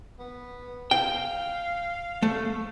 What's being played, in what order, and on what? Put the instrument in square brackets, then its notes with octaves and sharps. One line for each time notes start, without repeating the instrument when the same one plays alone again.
[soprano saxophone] B3
[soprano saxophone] F5 [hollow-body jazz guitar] G5
[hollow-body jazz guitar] A3